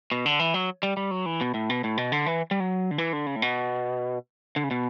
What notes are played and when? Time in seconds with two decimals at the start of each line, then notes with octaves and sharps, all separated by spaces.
0.12 B2
0.26 D3
0.39 E3
0.54 F#3
0.83 G3
0.97 G3
1.11 F#3
1.26 E3
1.41 B2
1.54 A2
1.70 B2
1.84 A2
1.97 B2
2.12 D3
2.26 E3
2.51 G3
2.60 F#3
2.91 D3
2.98 E3
3.13 D3
3.27 C#3
3.36 A2
3.42 B2
4.56 D3
4.64 C#3
4.71 B2